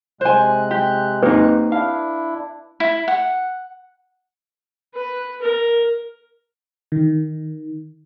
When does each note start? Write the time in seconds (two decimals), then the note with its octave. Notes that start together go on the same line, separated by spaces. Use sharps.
0.21 C3 G#3 C5 G#5 F#6
0.71 G4
1.23 A#3 C4 D#4 B4
1.72 D4 E4 F5
2.80 E4
3.08 F#5
4.95 B4
5.42 A#4
6.92 D#3